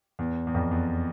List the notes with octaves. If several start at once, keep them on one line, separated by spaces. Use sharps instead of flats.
E2
E2
F2
E2